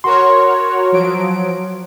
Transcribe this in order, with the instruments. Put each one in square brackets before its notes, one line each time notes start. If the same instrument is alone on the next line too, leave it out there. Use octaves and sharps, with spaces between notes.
[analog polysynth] F#4 A#4 C#5 [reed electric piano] C6
[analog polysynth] F3 F#3 D7